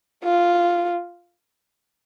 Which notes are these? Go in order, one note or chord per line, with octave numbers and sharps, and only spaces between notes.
F4